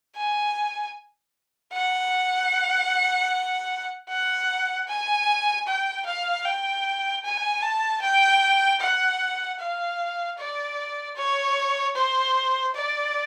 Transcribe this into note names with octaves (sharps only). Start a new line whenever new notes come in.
G#5
F#5
F#5
G#5
G5
F5
G5
G#5
A5
G5
F#5
F5
D5
C#5
C5
D5